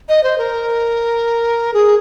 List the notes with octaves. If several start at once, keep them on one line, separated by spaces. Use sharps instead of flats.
D#5
C5
A#4
G#4